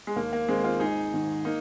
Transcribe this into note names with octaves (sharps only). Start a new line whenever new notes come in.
G#3
D#2 A#3
A#3
D#3 G#3 C4
C4 F4
G#1 D#4 G#4
G#2 D#3
A#3 D#4